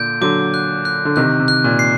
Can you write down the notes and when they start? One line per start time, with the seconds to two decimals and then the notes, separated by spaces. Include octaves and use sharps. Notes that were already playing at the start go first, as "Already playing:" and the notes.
Already playing: A#2 D3 G6 D7
0.21 D3 F#3 D6
0.54 F#6
0.85 F#6
1.05 D3
1.16 C3 D#3 F#6
1.40 C3
1.48 F#6
1.64 A#2
1.79 C7